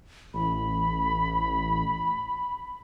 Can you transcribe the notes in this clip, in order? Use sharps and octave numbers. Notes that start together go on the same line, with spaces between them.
A1 B5